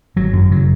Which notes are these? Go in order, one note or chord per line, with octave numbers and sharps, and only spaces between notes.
G#1 F#3
F#2
C#3 F#3